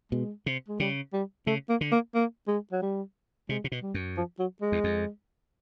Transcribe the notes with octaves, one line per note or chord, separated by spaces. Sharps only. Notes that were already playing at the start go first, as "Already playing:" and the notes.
B2 G#3
C3
G#3
C#3 G3
G3
C#3 A3
A#3
D3
A#3
A#3
G#3
F#3
G3
C3 G#3
C3
B2
G3
F#2
F3
F#3
G#3
E2
F2